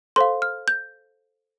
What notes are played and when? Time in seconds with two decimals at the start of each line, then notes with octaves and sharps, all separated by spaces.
0.16 A4 C5 F5 C6
0.42 F6
0.68 G6